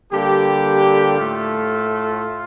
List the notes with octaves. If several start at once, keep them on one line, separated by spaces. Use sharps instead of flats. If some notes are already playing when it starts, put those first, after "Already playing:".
D3 G3 A#3 G4
A2 A3 F4